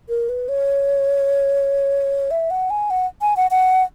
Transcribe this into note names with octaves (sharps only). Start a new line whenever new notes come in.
A#4
B4
C#5
E5
F#5
G#5
F#5
G#5
F#5
F#5